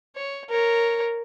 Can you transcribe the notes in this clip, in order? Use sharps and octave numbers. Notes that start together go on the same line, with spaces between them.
C#5
A#4 C#5